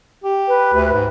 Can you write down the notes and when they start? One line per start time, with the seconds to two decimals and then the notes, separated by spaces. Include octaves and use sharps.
0.24 G4
0.48 B4
0.73 D2
0.93 G#2